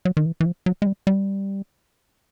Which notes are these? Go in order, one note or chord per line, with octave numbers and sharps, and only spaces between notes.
F#3
D#3
E3
E3
F3
F#3
G#3
G3
G3